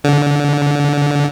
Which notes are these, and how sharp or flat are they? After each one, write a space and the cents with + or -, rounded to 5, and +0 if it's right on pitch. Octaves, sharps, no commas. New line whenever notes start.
D3 -20